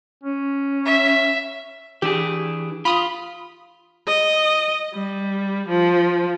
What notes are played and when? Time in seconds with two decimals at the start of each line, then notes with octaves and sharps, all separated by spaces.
0.24 C#4
0.86 E5
2.02 E3 D4 G4 G#4
2.85 F4 B5 D#6
4.07 D#5
4.94 G3
5.69 F3